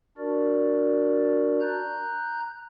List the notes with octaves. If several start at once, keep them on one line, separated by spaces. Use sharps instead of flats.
D4 F#4 A#4 D5
A#5 F#6 G6